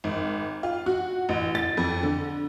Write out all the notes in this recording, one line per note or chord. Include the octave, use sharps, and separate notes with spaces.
G#1
F4
F#4
A1
A6
F2
D3